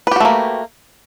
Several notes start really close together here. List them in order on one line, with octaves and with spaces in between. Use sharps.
B4 G4 F#4 A3 A#3